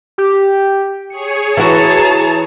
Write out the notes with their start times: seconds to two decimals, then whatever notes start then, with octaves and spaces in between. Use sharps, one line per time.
0.18 G4
1.10 G#4 C#5 C#7
1.57 E3 F#4 A5 A#5